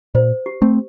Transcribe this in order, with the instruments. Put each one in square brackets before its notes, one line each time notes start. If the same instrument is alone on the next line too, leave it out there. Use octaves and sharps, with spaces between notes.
[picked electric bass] A#2 [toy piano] C5
[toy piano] G4
[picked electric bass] A3 C4